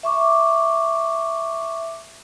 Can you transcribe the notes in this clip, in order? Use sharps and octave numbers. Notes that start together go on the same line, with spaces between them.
E5 C#6 D6